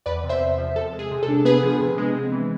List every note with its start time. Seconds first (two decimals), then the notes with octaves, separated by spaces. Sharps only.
0.06 E2 B4 D5
0.23 C3
0.29 C5 E5
0.40 E2
0.58 F3
0.76 C3 A4
0.93 G#3
0.99 G#4
1.11 C3
1.23 A4
1.28 D4
1.45 B3 G#4 B4
1.63 F3
1.80 C3
1.98 G#3
2.15 C4
2.32 E3